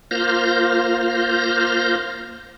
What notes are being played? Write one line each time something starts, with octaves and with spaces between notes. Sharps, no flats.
A#3 F4 C5 F6 G6 A#6